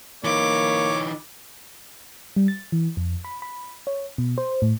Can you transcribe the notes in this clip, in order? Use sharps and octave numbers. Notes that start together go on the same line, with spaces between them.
E3 A#3 D#4 C#5 D6
G3
A6
E3
F2
B5
B5
C#5
B2
C5
A2